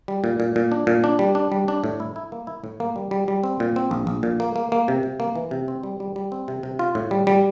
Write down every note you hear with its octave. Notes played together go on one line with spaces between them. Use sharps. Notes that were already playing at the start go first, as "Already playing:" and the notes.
G3
A#2
A#2
A#2
D4
A#2
D4
G3
D4
G3
D4
A2
E4
E4
A#3
E4
A2
A#3
G3
G3
G3
C4
A#2
C4
A#1
A#1
A#2
A#3
A#3
A#3
C3
C3
A#3
E3
C3
C4
G3
G3
G3
C4
C3
C3
F4
A2
G3
G3